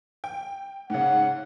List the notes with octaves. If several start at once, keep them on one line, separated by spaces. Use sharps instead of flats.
G5
G#2 C#3 F#5